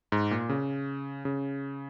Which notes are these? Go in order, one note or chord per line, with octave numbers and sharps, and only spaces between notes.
G#2
A#2
C#3
C#3